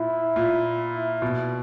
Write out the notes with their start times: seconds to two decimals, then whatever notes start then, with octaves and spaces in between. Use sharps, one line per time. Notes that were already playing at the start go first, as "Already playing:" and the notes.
Already playing: A#2 E4
0.36 A#2
1.22 B2